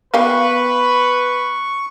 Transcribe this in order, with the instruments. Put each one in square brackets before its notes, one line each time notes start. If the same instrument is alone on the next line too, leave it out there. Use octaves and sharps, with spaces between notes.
[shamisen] B3 G4 F5 [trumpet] B4 [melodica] C#6